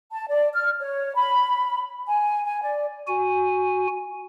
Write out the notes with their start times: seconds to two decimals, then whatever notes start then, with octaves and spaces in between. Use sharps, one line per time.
0.11 A5
0.28 D5
0.54 F6
0.80 C#5
1.15 B5
2.07 G#5
2.44 G#5
2.62 D5
3.07 F#4 G#5